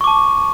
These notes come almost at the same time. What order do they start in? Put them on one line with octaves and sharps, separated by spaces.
C#6 D6 A5